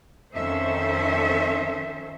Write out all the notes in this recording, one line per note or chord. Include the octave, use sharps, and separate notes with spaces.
F2 D#3 C#4 A4 C5 E5